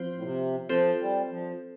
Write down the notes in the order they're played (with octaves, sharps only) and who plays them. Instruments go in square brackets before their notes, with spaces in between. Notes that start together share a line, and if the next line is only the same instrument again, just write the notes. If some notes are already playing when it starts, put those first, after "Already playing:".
Already playing: [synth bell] F3 C4 F4 C5
[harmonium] A2
C3
[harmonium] F3 [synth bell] C4 F4 A4 C5
[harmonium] G3
F3